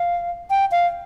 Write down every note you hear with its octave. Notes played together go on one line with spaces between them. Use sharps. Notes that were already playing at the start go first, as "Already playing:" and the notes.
Already playing: F5
G5
F5